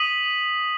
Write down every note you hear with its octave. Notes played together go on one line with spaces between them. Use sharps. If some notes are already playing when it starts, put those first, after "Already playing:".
Already playing: D#6 B6 D#7 F#7